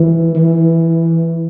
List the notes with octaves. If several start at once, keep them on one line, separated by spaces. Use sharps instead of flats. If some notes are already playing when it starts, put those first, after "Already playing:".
Already playing: E3
E3